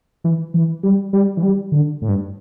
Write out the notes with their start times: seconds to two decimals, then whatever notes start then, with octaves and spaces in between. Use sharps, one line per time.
0.24 E3
0.54 E3
0.83 G3
1.13 G3
1.37 E3
1.43 G3
1.72 D3
2.02 A2
2.08 G2